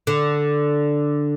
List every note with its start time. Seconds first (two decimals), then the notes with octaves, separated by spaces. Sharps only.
0.07 D3